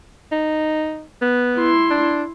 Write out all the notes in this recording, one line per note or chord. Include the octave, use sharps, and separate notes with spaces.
D#4
B3
E4 C6
D4